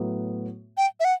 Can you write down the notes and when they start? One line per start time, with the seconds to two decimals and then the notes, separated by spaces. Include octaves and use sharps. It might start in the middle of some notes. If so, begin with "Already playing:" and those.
Already playing: A2 F#3 B3
0.77 G5
1.00 E5
1.05 F#5